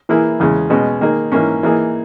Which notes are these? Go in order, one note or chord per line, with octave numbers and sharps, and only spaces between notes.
E3 A#3 E4 G#4
E2 C#3 G#3
B2 G#3 C#4 G#4
D#3 A#3 D#4 G#4
G#2 E3 A#3 C#4
E3 A#3 D#4 G#4